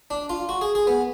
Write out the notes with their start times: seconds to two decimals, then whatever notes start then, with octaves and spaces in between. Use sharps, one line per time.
0.11 D4
0.29 F4
0.49 F#4
0.61 G#4
0.75 G#4
0.87 B3